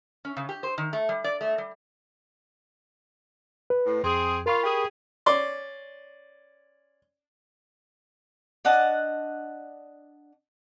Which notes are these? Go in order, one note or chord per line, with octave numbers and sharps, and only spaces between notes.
C#4
C#3
G4
C5
D#3
A3
G3
D5
A3
G3
B4
A2
F2 C4 G#4
F4 A#4 B5 C#6
G4 G#4
C#4 D5 C6
D4 D#5 F#5 A5